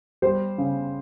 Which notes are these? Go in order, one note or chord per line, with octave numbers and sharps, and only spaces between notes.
G3 C5
C#3